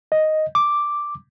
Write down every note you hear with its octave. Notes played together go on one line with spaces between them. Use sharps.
D#5
D6